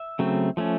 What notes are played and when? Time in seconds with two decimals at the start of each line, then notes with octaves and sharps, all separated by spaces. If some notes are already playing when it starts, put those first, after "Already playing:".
Already playing: E5
0.19 C#3 F#3 A3 C4
0.57 F3 A3 C#4